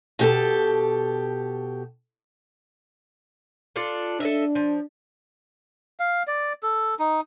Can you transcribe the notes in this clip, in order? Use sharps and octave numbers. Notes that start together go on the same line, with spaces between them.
B2 G4 A4
D4 F4 A4
D4 A4 D#5 E5
F3
F5
D5
A4
D#4